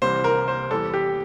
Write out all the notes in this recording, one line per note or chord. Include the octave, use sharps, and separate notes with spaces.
C2 C3 E3 G3 C5
A#4
C5
E2 E3 G3 A4
G4